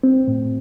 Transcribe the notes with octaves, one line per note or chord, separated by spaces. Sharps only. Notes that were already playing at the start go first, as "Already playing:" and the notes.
C4
A2